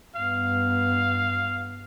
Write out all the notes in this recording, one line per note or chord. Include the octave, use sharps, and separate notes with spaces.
G2 B3 F5